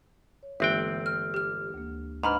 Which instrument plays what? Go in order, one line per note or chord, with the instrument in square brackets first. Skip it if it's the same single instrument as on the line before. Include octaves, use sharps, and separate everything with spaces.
[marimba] C#5
[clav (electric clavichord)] G1 C4 G5 [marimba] E3 G#3 A#3 [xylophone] E5 F#6
[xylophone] F6
G4 F6
[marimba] D2 A#3
[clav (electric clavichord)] G#2 [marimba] D4 B4 [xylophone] A#5 B5 F6